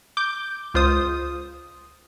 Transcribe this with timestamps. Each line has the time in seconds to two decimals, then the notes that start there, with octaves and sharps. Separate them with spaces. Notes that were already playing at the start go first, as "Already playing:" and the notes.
0.17 D6 G6
0.74 C#2 F4 C5 D#6